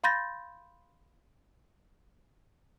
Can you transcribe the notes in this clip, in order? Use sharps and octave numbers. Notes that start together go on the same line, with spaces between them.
F5 B5 C6 G6 A6 A#6